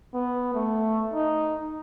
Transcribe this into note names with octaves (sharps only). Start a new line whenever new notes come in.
B3
A3
D#4